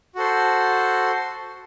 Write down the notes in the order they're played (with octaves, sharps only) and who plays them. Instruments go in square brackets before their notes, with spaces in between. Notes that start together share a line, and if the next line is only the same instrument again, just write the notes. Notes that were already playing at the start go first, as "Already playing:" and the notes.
[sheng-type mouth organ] F#4 A4 C5